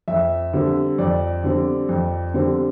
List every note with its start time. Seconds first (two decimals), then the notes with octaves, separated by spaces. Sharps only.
0.08 F2 E5
0.53 D3 G3 C4
0.98 F2 D5
1.44 D3 G3 C4
1.89 F2
2.34 D3 G3 C4